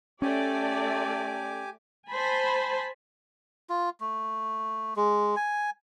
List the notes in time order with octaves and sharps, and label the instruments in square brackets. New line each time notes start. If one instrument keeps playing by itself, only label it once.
[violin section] A3 D5 [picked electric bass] C#4 [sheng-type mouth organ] G4 G#5 D6
[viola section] C5 G#5 A5 B5
[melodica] F4
A3
G#3
G#5